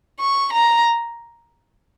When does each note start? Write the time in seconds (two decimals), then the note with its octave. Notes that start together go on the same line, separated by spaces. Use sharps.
0.20 C#6
0.52 A#5